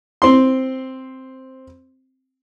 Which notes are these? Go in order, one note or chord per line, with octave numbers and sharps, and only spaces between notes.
C4 C6